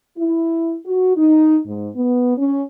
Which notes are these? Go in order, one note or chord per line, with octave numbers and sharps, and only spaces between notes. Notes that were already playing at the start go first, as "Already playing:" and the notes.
E4
F#4
D#4
G#2
B3
C#4